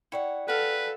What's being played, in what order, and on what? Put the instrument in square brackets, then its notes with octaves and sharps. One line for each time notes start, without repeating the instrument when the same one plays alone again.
[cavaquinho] E4 C#5 F#5 [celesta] D5 G5 C#7
[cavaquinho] F#4 F5 [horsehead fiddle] A4 [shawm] B4